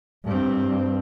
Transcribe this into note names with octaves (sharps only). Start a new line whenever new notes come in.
G2 C4